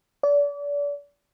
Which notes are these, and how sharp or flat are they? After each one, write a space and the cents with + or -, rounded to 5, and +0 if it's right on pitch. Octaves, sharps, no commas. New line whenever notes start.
D5 -35